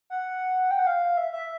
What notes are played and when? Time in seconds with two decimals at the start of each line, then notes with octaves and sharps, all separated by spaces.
0.10 F#5
0.71 G5
0.79 F#5
0.87 F5
1.17 E5
1.32 E5